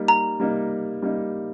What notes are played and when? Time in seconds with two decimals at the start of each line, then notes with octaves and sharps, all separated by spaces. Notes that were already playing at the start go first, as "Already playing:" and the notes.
Already playing: G3 A#3 D#4
0.08 A#5
0.40 G3 A#3 D#4
1.02 G3 A#3 D#4